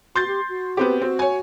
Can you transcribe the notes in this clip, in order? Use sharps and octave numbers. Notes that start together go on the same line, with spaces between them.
F#4 C6 G6 A6
G4
F#4
B3 C4 G4
C4 F#4
C#5 G#5